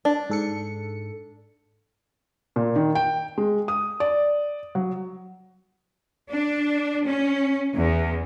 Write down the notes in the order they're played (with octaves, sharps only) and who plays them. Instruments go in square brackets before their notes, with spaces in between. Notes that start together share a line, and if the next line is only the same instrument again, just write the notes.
[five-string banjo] D4
[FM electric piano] G#2 A4 C#7
[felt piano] A#2
D#3
G5
G#3
D#6
D5
F#3
[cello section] D4
C#4
E2